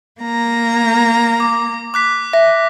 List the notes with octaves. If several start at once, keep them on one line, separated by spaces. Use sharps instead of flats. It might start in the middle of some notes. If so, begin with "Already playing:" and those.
A#3 A#5
D6
D6 F#6 B6
E5 A#6